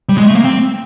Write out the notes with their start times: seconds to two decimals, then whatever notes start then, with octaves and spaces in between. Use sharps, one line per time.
0.09 G3
0.18 G#3
0.26 A3
0.35 A#3
0.45 C4